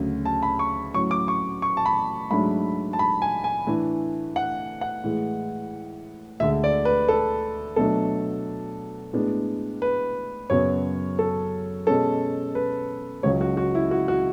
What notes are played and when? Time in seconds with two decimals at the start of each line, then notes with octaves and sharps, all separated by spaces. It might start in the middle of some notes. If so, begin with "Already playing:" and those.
Already playing: D2 C#3 F#3 C#4
0.25 A5
0.43 B5
0.59 C#6
0.94 A2 F#3 C#4 C#6
1.11 D6
1.28 C#6
1.62 C#6
1.77 A5
1.86 B5
2.31 G#2 F#3 A3 D4 B5
2.93 A5
2.99 B5
3.22 G#5
3.44 G#5
3.67 A2 E3 A3 D4
4.36 F#5
4.81 F#5
5.04 A2 E3 G#3
6.40 D2 D3 G#3 E5
6.64 D5
6.85 B4
7.08 A4
7.76 B2 F#3 A3 D4 A4
9.13 A2 G#3 B3 D4
9.82 B4
10.50 F#2 C#3 F#3 B3 C#5
11.19 A4
11.87 B2 G#3 C#4 A4
12.55 B4
13.23 C#2 C#3 F#3 C#5
13.41 F#4
13.57 F#4
13.75 E4
13.91 F#4
14.08 F#4